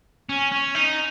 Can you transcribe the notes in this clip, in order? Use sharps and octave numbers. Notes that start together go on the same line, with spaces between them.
C#4
C#4
D#4